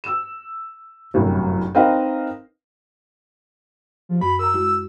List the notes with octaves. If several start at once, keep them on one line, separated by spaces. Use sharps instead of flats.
E6 E7
G1 C2 F#2 A2 C3 F#3
C4 D#4 A#4 B4 D#5 F5
F3
F#2 F#4 B5
A#4 A#5 E6
G#3 E4 F#4